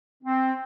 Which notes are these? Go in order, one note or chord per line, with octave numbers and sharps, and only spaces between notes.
C4